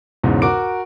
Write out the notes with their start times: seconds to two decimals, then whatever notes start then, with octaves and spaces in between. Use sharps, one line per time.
0.23 B1 E2 G#2 C#3
0.42 F#4 A#4 D6 D7